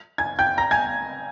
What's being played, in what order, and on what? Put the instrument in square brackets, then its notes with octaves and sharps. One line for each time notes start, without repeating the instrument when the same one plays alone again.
[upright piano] G#5 G#6
G5 G6
A#5 A#6
G#5 G#6